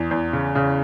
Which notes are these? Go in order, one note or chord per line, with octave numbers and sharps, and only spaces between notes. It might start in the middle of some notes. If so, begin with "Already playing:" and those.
Already playing: E2
E2
C#3
C#3